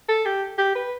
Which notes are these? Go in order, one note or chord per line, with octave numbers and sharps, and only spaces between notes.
A4
G4
G4
B4